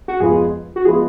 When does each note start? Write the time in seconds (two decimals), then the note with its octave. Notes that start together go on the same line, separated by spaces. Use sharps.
0.08 F#4
0.20 F2 F3 G#3 B3 F4 G#4
0.76 F#4
0.85 F3 G#3 B3 F4 G#4